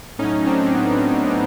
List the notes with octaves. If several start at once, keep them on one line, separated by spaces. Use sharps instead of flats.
A2 F#3 C#4 D#4
C4 D4
B3 C#4